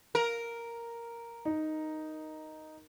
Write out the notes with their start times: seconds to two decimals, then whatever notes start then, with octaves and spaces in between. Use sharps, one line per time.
0.15 A#4
1.45 D#4